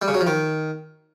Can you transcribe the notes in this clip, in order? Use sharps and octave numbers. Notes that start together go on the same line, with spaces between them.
G3
C#3
F#3
F3
D#3